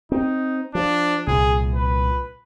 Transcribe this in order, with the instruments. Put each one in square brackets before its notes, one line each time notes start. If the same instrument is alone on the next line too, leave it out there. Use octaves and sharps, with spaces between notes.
[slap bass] C4 [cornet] D#4
[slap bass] F3 [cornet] D4
[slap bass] C2 A#2 [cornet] G#4
[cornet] B4